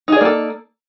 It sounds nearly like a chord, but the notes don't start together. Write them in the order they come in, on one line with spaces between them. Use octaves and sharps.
D#4 G#4 D5 A#3 A4